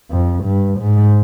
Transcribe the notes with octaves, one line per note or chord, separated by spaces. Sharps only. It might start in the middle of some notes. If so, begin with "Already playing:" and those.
F2
G2
G#2